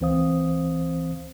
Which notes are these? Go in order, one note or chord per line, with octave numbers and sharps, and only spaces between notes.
C#2 E3 C4 C5 F5 D#6